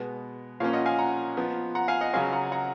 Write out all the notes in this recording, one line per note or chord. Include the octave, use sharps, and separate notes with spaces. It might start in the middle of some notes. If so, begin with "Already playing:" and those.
Already playing: B2 G#3 B3
A#2 F3 A#3 C#4 C#5 F5
D#5 F#5
F5 G#5
F#5 A#5
F3 B3
F#5 A#5
F5 G#5
D#5 F#5
C#3 F#3 C#4 F5 G#5
F#5 A#5
F#5 A#5